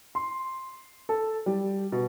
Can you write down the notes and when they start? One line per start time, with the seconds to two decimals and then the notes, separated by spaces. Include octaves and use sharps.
0.15 C6
1.09 A4
1.46 G3
1.92 B2